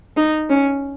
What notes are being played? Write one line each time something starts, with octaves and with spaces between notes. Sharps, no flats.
D#4
C#4